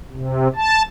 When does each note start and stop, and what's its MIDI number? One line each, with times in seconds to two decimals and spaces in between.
0.12 0.48 48
0.55 0.82 81